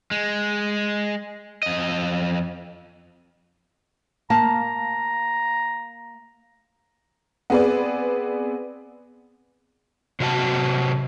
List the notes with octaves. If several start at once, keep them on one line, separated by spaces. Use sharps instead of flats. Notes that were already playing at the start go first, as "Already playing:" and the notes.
G#3
F2 D#5
A#3 F5 A5 A#5
B3 C4 G#4 B4 D5
C3 F#3 C4 F#4 D5 A5